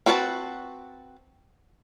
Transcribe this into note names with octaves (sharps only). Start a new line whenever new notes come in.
C4 F#4 B4 C#5 A5